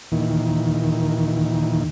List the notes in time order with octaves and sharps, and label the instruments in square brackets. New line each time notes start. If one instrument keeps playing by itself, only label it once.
[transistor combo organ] D#2 A#2 D#3 E3